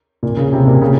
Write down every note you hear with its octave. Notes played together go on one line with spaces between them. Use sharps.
A#2
C#3
C3
A#2
C#3